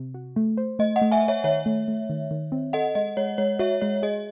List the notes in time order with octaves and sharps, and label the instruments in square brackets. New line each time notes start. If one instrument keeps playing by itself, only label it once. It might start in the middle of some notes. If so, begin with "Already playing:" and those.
Already playing: [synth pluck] C3
F#4
A3
C5
[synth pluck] A3 [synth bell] D#5
[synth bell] D#5 F#5
[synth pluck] A3
[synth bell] E5 G#5
[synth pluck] C5
[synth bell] C#5 E5
[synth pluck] D#3 [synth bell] C#5 E5
[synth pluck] A3
A3
D#3
D#3
C4
[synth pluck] A4 [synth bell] D#5 F#5
[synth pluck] G#3 [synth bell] D#5
[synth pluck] G#3 [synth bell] C#5
[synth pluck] G#3 [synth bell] C#5
[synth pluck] F#4 [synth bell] C#5 E5
[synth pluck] G#3 [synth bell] C#5
[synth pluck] G#4 [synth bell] D#5